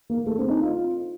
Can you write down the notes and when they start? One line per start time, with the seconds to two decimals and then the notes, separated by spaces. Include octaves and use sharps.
0.10 A#3
0.27 A3
0.39 C4
0.49 D#4
0.61 F4